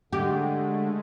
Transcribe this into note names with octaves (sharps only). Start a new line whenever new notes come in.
D3 G#3 A3 G4